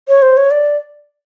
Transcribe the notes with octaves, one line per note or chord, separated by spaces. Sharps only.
C#5
C5
C#5
D5